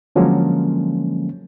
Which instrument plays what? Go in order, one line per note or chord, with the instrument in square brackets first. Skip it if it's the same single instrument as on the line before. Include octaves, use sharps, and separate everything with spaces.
[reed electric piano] D3 F3 F#3 G#3 A#3 C#4